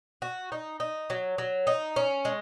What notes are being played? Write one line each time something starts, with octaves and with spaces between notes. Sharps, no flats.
F#4
D#4
D#4
F#3
F#3
D#4
C#4
G#3